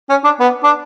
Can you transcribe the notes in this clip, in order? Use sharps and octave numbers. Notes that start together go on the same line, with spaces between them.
C#4
D4
B3
D4